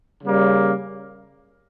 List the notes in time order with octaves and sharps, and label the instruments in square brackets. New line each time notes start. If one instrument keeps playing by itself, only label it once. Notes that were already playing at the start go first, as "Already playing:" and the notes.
[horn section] C#3 G3 A#3